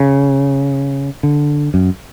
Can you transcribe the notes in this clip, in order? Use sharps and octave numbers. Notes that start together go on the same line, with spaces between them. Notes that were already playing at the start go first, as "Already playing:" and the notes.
Already playing: C#3
D3
F#2